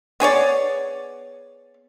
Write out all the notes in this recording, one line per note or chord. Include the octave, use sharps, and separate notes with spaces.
B3 G#4 C#5 D5